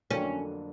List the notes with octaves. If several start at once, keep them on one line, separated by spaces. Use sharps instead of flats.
F2 D3 F#3 A#3 C#4 D4